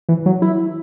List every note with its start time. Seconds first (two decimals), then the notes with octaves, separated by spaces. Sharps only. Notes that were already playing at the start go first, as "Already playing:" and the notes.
0.09 E3
0.26 F#3
0.42 E4